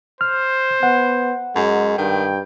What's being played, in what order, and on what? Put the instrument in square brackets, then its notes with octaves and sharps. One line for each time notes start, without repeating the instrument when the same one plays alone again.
[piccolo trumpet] C5 [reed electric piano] F6
[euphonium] B3 [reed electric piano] F#5
[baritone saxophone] F#2 [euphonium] G#3
[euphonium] G2 [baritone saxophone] D#3 [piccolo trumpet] G5